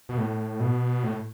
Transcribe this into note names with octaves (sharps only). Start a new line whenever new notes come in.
B2
A2
B2
A2